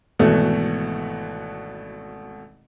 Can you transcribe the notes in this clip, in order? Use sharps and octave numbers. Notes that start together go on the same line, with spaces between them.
G#1 B2 E3 A3 F#4 A4